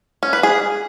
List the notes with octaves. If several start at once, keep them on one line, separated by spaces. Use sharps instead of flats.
C#4
B4
G#4